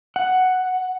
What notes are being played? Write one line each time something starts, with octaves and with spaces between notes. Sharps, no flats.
F#5